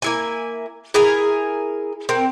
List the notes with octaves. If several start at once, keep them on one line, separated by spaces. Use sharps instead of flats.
A#3 E4 G#5
E4 G#4 A#4 G#5
C4 A#4